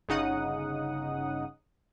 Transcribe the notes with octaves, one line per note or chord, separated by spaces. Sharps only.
G1 C#3 D#4 F#5 D#6